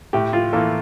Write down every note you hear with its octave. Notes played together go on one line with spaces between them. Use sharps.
A2 G4
F4
E3 A#3 F4 A4